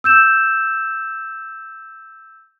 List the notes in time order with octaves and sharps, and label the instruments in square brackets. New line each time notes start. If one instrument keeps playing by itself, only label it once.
[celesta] E6 G6 E7